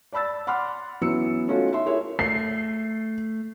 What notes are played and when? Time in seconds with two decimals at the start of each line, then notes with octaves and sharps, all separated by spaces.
0.12 D5 A5 B5 E6 A6
0.47 F#5 B5 C6 D6 F6
1.01 E3 F#3 B3 C#4 E6 C#7
1.48 A3 C#4 D#4 F4 F#4 A4
1.73 E5 C6
1.86 E4 G#4 A#4 C#5 E5
2.19 A3 C7